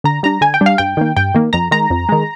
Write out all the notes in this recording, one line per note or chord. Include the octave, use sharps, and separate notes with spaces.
D3 A#5
G3 D4 A#5
D3 G#5
G5
G3 D4
F5
G2 G5
D#3 A#3
G2 G5
D#3 A#3
F2 A#5
D#3 G#3 A#5
F2
D#3 G#3